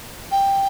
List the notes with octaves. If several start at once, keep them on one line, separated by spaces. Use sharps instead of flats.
G5